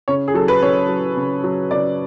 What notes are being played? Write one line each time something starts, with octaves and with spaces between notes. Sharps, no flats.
C#3 C#5
G#4
F#3 A4
B4
C#3 C#5
F#3
C#3
F#3
C#3 D5